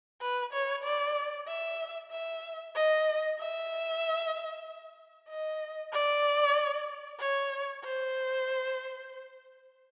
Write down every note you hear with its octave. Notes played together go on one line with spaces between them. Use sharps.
B4
C#5
D5
E5
E5
D#5
E5
D#5
D5
C#5
C5